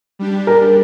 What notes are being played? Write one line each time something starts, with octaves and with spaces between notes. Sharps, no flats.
G3 D4 G4
A#4